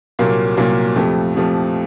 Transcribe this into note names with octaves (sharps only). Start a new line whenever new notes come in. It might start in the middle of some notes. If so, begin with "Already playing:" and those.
C2 A#2 F#3 A#3
C2 A#2 F#3 A#3
F2 C3 F3 A3
F2 C3 F3 A3